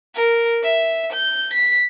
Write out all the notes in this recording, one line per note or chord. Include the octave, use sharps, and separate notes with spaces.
A#4
E5
G6
B6